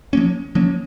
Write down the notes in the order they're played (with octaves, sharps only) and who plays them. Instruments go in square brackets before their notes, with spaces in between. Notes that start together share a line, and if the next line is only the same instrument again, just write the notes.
[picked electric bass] F3 A#3 C#4
F3 A#3 C#4